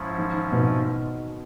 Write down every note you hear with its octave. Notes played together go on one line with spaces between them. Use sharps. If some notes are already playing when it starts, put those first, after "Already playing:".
Already playing: G#2 F3 G#3 C#4 E4
D#3
B2